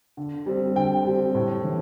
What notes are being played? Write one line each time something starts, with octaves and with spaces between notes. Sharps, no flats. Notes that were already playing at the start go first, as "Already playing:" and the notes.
D3
G3 C4
D3 G5
G3 C4
A2
E3